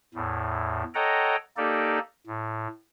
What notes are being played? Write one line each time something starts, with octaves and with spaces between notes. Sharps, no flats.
E2 A2
A4 C#5 D#5 F#5 G5 A#5
A#3 D#4 G4 A4 D5
A2